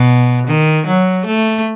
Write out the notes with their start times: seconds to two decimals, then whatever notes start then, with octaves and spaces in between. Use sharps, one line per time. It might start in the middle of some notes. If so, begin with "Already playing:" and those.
Already playing: B2
0.47 D#3
0.87 F#3
1.26 A3